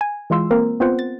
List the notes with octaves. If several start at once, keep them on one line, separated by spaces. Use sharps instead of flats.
G#5
E3 G#3 F4 C6 E6
A#3 C4 A#4
B3 C4 F4 C5 F#5
A6